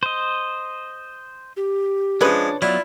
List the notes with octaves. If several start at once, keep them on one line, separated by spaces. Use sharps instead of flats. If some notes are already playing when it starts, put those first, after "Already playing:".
C5 D#5
G4
F3 G#3 C#4 D4 B4 C#5
F#3 B3 E4 F4 D5